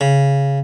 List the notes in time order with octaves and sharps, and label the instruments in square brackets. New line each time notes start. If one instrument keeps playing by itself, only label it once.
[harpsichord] C#3